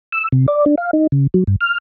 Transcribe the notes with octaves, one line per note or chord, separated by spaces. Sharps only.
E6
C3
D5
D4
F5
D#4
C#3
F#3
G2
F6